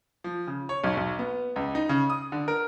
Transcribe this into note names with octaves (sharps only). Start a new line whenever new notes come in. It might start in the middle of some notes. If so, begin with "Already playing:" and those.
F3
C#3
C#5
B1
B1
B3
C#2
D#4
C#3
D#6
D3
A#4